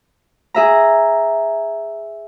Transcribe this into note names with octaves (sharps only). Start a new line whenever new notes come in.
G#4 E5 A#5